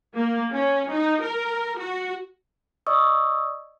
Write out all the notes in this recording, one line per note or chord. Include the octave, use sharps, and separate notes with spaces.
A#3
C#4
D#4
A#4
F#4
D5 D#5 C#6 D#6 E6